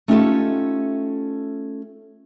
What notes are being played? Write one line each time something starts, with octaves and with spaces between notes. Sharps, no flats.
A3 C#4 D#4 F4 G4 A4